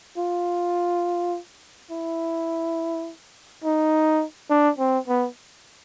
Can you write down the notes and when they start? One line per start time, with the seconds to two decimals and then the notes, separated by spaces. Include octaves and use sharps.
0.18 F4
1.91 E4
3.64 D#4
4.50 D4
4.78 C4
5.08 B3